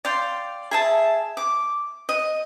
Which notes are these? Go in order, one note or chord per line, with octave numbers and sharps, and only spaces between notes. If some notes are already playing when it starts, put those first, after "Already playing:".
D5 F5 G5 C6
G#4 E5 A5
D6
D#5